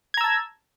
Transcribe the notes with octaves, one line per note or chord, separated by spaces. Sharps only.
A5 A#5 E6 G#6